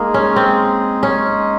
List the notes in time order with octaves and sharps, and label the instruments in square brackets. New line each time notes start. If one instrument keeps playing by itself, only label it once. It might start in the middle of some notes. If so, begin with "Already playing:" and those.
Already playing: [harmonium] G#3 D#4 G#4 [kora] A#3
[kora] C#4
C4
C#4